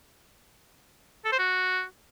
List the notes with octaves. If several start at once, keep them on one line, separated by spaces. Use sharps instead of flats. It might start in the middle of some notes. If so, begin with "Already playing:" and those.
A4
C5
F#4